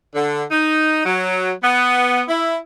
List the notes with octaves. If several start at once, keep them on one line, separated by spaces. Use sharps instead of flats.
D3
D#4
F#3
B3
E4